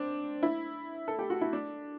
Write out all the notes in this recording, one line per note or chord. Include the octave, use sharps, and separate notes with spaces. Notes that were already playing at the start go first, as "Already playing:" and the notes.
Already playing: C4 D4
E4
A4
G4
F#4
E4
D4